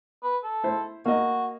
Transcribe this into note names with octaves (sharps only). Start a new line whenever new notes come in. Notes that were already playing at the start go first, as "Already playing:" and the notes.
B4
A4
E4 C5
A#3 F#4 D#5